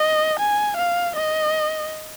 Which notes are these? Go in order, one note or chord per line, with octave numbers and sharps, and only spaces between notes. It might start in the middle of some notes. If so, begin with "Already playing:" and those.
Already playing: D#5
G#5
F5
D#5